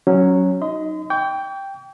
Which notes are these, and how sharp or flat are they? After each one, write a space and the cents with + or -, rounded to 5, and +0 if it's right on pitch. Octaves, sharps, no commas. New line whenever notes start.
F#3 +0 C#4 +0
D#4 +0 D#5 +20 C6 -40
G5 +0 C#6 +45